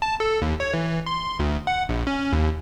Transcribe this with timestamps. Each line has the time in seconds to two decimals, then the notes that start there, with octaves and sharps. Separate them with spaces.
0.02 A5
0.20 A4
0.42 D#2
0.60 C#5
0.73 E3
1.06 C6
1.39 D2
1.67 F#5
1.89 A#1
2.07 C#4
2.32 D#2